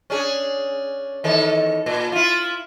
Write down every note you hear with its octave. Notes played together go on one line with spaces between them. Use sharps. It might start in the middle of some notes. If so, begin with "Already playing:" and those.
C#4 D4 G#4
E2 D#3 A4
A#2
E4 F4